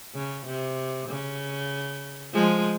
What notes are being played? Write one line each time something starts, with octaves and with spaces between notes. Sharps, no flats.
C#3
C3
C#3
F3 G#3